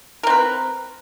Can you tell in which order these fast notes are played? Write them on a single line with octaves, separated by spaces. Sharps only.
A#4 C4 B4